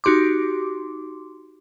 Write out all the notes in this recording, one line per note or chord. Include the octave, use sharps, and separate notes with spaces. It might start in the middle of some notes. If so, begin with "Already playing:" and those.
D#4 F#4 G4 C6 D6